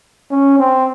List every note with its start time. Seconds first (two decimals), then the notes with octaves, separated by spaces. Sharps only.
0.31 C#4
0.59 C4